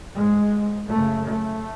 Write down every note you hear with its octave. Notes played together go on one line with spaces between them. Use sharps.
G#2 G#3
F#2 C#3 A3
A3